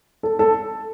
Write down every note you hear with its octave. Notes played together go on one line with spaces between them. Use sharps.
A4
A4